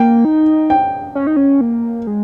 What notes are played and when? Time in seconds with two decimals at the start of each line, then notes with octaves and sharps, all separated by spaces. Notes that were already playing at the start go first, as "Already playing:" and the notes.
Already playing: A#3 G5
0.25 D#4
0.70 G5
1.15 C#4
1.27 D#4
1.36 C#4
1.61 A#3
2.07 G#3